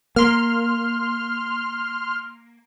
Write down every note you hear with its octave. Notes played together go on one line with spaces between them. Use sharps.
A#3 C6 F6